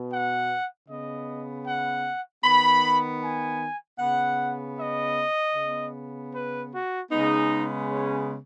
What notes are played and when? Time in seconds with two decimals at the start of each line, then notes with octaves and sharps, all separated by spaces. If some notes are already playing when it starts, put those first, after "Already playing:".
Already playing: B2 B3
0.10 F#5
0.87 C#3 B3 D#5
1.66 F#5
2.43 D#3 B3 B5
3.22 G#5
3.99 C#3 B3 F#5
4.78 D#5
5.55 C#3 B3
6.33 B4
6.72 F#4
7.11 C#3 G#3 B3 D#4
7.88 C#4